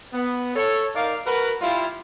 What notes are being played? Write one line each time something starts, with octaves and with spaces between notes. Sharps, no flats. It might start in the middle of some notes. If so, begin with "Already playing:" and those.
B3
A4 C#5
D#4 A#4 D5 F5
F#4 A#4 B4
G3 E4 F4